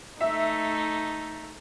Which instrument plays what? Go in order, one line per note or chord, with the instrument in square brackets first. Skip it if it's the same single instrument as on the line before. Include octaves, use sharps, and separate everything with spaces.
[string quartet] A3 D#4 [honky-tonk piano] E5